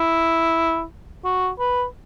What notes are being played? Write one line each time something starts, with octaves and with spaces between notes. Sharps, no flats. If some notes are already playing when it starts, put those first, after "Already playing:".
Already playing: E4
F#4
B4